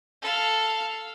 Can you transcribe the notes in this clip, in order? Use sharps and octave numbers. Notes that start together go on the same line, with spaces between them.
A4 F5